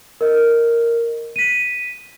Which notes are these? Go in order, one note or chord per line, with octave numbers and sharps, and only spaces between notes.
A#4 D#5
B6 D#7